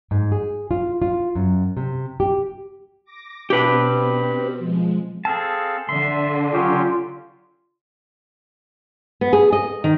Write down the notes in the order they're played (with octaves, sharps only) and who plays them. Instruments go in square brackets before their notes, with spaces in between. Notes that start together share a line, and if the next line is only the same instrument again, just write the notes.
[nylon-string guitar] G#2
G#4
F4
F4
F#2
C3
G4
[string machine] D6 A#6
[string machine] B2 C4 [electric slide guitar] G4 B4
[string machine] F3 G#3
[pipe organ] C4 A4 F5 [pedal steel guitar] G#4 A5
[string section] D3 [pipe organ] E5 [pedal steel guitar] C6
[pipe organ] F#3 C#4 G4 [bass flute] F4
[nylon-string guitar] B3
G#4
D#5
D#3